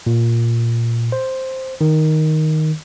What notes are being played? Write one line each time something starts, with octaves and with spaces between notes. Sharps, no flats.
A#2
C5
D#3